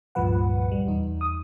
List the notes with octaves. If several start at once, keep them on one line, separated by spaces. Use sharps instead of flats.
C#2 G2 A#2 F3 B4 F#5
G3
E2 D#4
D#6